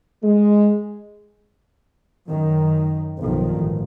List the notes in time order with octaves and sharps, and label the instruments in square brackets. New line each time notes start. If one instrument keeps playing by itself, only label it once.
[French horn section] G#3
[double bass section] F#2 D#3
B1 G2 D#3 F3
A1